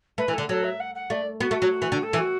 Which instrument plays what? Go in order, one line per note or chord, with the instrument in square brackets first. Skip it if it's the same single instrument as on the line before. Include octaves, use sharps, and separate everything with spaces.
[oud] A3 [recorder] B4
[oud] E3
[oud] D3 [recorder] A4
[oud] F#3 [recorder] A4
[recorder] E5
F#5
F#5
[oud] A3 [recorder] D5
[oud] B3 [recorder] F#4
[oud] A3
F#3
E3
D3
[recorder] A4
[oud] E3
[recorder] F#4